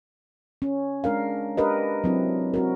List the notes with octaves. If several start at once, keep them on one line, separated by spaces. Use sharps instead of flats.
C#4
G#3 D4 A#4 F5
D4 G4 A#4 B4 D#5
F#3 C4 E4
C4 F#4 A#4